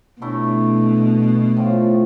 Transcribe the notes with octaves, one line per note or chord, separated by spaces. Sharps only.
B2 D3 A3 E4
A2 F3 A3